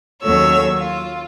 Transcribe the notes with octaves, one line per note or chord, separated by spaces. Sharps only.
D#2 F#3 C#4 A4 C#5 E6
F4